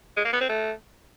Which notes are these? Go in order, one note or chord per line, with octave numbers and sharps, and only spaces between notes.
G#3
A#3
B3
C4
A3